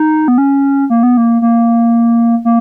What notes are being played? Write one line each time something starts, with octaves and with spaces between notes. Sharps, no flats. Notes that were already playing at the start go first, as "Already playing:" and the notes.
Already playing: D#4
B3
C#4
A#3
B3
A#3
A#3
A#3